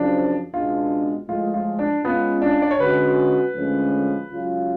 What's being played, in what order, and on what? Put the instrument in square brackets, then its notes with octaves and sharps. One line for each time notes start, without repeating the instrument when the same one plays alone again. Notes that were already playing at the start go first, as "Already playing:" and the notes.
Already playing: [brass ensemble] F#2 C#3 F3 [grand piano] D4
[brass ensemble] C#2 B2 G#3 B3 D4 [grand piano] F4
[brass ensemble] A2 F3 G#3 [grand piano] F4
[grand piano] F4
D4
[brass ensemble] C#2 C#3 G#3 C#4 F4 [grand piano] B3
[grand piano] D4
D5
C#5
[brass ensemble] D3 G#3 C#4 F#4 [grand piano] B4
[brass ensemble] D2 D3 F3 G#3 C#4
C#2 C#3 F#3 C#4 F4